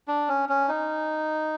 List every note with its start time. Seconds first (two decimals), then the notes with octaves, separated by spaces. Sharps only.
0.08 D4
0.29 C#4
0.49 C#4
0.69 D#4